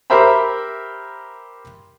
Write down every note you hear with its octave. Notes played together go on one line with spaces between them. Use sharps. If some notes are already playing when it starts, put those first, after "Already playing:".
G4 A#4 C5 E5 A#5 B5